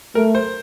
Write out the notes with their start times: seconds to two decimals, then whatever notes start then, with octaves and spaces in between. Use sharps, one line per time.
0.15 A3 A#4
0.35 C5